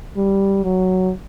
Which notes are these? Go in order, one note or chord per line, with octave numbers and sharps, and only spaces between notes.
G3
F#3